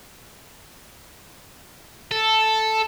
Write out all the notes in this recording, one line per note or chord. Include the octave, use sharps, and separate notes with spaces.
A4